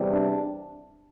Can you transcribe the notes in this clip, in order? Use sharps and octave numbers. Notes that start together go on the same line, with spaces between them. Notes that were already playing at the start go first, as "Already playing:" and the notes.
Already playing: E2 C3 G3
D4